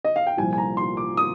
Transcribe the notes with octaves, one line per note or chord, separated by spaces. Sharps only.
D#5
F5
G5
C2 A#2 F3 G#5
G#5
A#5
C6
D6
D#6